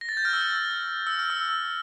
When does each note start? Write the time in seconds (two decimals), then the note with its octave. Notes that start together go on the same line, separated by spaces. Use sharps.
0.01 A#6
0.09 A6
0.17 G6
0.25 F6
0.33 E6
1.07 E6
1.19 F6
1.30 E6